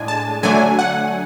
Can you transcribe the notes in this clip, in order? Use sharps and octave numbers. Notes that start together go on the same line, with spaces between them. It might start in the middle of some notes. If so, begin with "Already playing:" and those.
Already playing: A2 G#3 D4 G#5
A5
D3 F#3 A3 D4 G#5
F#5